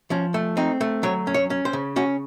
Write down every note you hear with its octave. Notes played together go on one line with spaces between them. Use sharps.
F3 C#4
A3
C4 D#4
A3
F#3 C#5
C#4
C#5
C#4
C5
C#3
C#4 F#4